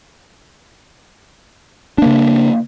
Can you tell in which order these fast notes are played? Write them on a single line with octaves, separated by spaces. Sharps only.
D4 A#3 C#3